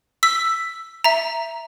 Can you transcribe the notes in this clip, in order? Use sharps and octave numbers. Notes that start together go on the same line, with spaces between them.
E6 B6
E5 A#5